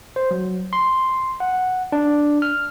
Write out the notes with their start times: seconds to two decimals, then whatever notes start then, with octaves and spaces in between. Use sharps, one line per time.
0.16 C5
0.31 F#3
0.73 C6
1.40 F#5
1.92 D4
2.42 F6